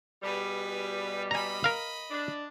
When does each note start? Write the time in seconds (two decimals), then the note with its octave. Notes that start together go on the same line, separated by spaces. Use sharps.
0.23 B2 G3 G#4 B4
1.31 D#5 G#5 A#5 B5
1.64 A#4 F5
2.11 D4